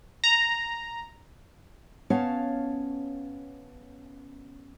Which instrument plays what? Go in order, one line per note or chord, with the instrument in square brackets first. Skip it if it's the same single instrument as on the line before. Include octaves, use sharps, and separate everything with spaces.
[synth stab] A#5
[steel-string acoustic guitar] B3 C#4 C#5 F5 A5